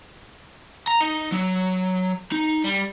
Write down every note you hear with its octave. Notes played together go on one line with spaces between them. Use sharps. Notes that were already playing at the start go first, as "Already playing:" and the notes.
A#5
D#4
F#3
D#4
G3